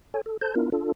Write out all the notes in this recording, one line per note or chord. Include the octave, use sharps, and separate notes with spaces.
A4 C#5 G#5
A4
A4 C5 A5 G6
B3 D4 E4 F4 A#4
D4 F4 A4